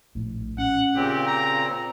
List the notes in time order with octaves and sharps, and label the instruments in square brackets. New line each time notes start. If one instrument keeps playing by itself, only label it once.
[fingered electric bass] A#1 A2
[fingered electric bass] C#4 [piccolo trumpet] F#5
[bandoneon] A#2 C#3 C4 [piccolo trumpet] G4
[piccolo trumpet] A#5